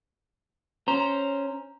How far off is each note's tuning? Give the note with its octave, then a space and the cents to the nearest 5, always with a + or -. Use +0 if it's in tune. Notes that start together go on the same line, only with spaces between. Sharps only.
C#4 +0 C5 +0 A#5 +0